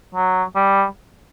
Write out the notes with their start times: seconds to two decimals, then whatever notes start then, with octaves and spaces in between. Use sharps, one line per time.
0.15 F#3
0.56 G3